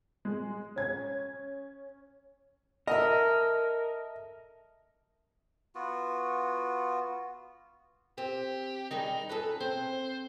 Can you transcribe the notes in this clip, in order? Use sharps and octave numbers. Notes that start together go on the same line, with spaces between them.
G#3
C#4 G#6
A4 A#4 D#5 E5
B3 F4 F#4
C4 G4
D#3 G3 G#3 D#4
C#4 G#4 A4 B4
C4 C5